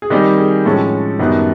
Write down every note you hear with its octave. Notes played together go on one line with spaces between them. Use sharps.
G#4
D#3 G3 C4 D#4 G4
G#4
A2 F3 G#3 C#4 A4
F#2 D#3 G3 B3 D#4